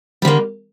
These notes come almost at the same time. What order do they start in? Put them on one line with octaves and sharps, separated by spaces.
G3 D3 A#3